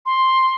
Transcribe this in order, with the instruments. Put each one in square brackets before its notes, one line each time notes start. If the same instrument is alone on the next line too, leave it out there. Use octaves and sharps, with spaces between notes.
[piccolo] C6